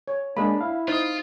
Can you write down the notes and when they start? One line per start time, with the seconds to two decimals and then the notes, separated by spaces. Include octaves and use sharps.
0.08 C#5
0.37 G#3 A#3 D4 B5
0.61 E4 F5
0.88 D#4 F4 C5 D#6